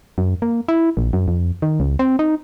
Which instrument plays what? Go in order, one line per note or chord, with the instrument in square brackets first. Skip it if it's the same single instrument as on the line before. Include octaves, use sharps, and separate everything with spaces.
[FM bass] F#2
A#3
E4
A#1
F#2
F2
D#3
C#2
C4
D#4